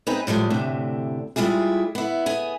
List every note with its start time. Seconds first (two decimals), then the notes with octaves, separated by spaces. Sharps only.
0.07 B3 C4 D#4 G#4 B4
0.27 A2 F3 G3 G#3
0.50 D2 A2 C3 D4
1.36 G3 G#3 E4 F4 G#4
1.95 B3 E4
2.26 B3 G#4 G#5